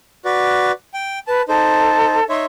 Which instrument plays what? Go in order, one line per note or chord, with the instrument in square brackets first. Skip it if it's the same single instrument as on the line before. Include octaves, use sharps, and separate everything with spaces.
[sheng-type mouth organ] F#4 B4 D5
G5
[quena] B4 [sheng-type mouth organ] A5
[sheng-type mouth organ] D#4 C5 [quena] A4
[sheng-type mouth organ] D#4 C#5 E5 [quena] C6